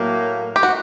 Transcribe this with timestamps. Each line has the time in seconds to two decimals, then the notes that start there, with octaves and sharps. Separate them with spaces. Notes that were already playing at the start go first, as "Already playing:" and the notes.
Already playing: A2 F#3 A#3
0.56 G4
0.63 F#4